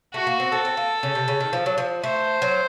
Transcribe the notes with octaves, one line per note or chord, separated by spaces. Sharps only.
A3 F#4
A#3
C4
C4 A4
C4
A#3
C#3
C3
C#3
D#3
F3
F#3
F3
A3 C5
F#3